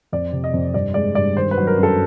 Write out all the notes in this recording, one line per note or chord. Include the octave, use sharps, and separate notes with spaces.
F2 D5
C3
D#5
F2
G2 D5
G#3 D5
G2 D5
D#3 C5
B4
F#3
A#4
F#2
A4